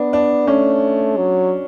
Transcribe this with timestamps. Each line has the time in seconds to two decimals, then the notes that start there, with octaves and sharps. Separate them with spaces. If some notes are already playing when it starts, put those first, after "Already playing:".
Already playing: B3 D4
0.13 D4
0.47 A3 C#4
1.17 F#3